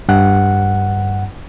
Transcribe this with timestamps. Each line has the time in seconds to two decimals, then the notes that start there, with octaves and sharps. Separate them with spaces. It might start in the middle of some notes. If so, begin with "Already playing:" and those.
0.08 G2 F#5